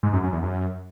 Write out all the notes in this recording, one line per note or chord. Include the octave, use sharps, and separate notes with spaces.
G#2
F#2
F#2
E2
F#2